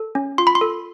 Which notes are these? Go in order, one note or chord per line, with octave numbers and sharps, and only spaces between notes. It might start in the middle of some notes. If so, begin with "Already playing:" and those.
Already playing: A4
C#4
F4 C6
B5
C6
A4